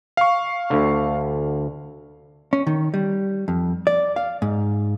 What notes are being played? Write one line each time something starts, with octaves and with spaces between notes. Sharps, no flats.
F5 C#6
D2 D3
C#4
D#3
G3
F2
D5
F5
G#2